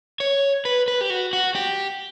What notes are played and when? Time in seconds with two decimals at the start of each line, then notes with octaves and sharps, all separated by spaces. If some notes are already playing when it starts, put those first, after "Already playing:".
0.20 C#5
0.65 B4
0.88 B4
1.01 G4
1.10 F#4
1.33 F#4
1.55 G4